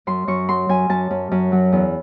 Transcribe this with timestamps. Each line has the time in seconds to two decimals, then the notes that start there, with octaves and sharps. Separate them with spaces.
0.07 F#2 C6
0.27 F#2 C#6
0.48 F#3 C6
0.69 F#2 G#5
0.90 F#2 A5
1.11 F#2
1.31 F#2
1.52 F#3
1.72 E2